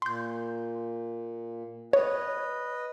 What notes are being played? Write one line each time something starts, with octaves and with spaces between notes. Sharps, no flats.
A#2 C6 G6
B4 C#5 D#5